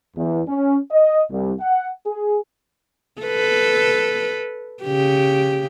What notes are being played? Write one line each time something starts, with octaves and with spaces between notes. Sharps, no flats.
E2
C#4
D#5
C2
F#5
G#4
A4 B4
C#3 G4